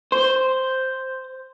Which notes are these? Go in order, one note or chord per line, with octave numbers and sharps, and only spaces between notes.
C5